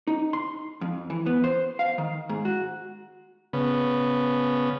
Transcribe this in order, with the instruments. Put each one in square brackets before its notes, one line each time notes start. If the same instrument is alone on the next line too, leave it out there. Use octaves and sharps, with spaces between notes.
[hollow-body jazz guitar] D#4
C6
F2
E3
B3
C5
F5
D#3
G#2
F#4
[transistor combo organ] C#3 B3